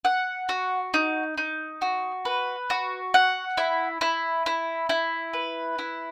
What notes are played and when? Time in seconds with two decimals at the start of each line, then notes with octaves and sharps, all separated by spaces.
0.05 F#5
0.49 F#4
0.94 D#4
1.37 D#4
1.82 F#4
2.25 B4
2.70 F#4
3.14 F#5
3.57 E4
4.01 E4
4.46 E4
4.89 E4
5.33 B4
5.79 E4